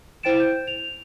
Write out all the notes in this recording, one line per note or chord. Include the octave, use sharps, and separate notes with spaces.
E4 C5 G5 A6 D7 E7
G6
F7